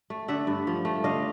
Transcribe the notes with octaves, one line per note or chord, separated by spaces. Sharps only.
A3
D3 E5 F#5
G2
F3
A3
D3 D#5 F5